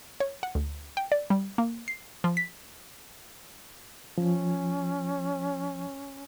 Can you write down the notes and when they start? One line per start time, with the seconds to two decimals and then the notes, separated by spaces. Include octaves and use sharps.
0.20 C#5
0.43 F#5
0.55 D2
0.97 G5
1.12 D5
1.30 G3
1.58 A#3
1.88 C7
2.24 F3
2.37 B6
4.18 F3 C#4